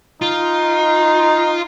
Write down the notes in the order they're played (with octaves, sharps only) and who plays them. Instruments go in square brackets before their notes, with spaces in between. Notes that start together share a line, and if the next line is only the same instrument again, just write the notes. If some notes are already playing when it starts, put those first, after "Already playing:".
[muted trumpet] D#4 [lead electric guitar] F4